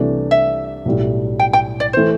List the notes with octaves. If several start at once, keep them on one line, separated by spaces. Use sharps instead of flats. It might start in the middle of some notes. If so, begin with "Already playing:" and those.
Already playing: C2 C3 E3 A3 D4
E5
B1 A2 G3
G5
G5
D5
E3 A3 C5